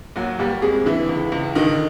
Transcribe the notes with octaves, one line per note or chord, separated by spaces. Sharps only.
D#2 F#3 F#4
D#2 G3 G4
F2 G#3 G#4
D3 E3 E4
C#2
C#2
D3 D#3 D#4